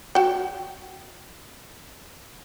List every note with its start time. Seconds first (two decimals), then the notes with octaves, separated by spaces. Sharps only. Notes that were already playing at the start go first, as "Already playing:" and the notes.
0.15 F#4 G5